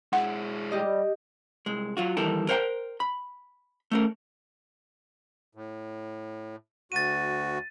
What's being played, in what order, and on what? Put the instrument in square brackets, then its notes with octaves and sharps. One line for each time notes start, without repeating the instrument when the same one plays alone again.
[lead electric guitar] G#3 E4 [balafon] F#5
[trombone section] G3 [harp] G4 D#5
[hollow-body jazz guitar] C2 G#3
F#3 F4 F#4
D#2 E3 G3 A4 A#4
A#4 C5 C#5 F#5 G5 A#5
B5
A3 C#4 A#4
[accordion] A2
[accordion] D2 F#4 [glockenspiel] A6 D#7